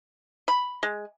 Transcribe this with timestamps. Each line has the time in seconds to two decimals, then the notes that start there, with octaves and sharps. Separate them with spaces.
0.48 B5
0.83 G#3